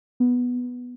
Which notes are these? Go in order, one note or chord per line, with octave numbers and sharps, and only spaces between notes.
B3